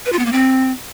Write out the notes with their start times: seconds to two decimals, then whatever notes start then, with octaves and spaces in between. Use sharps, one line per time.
0.06 B4
0.12 F4
0.19 B3
0.26 A#3
0.32 C4